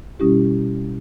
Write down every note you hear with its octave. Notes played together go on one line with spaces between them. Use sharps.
B2 G3 C#4 E4 G4